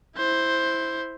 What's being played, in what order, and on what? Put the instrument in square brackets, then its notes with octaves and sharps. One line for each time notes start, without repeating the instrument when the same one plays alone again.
[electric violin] E4 C5